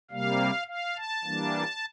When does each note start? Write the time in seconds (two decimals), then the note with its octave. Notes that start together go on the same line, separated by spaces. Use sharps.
0.11 C3 G3 A#3 F5
0.67 F5
0.96 A5
1.24 E3 G3 A#3 D4